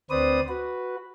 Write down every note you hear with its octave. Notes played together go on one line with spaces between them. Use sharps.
D2 C4 B4 C5 D5 D#6
F#4 B4